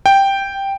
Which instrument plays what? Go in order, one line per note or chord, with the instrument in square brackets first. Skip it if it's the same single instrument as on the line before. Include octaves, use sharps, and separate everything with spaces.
[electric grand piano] G5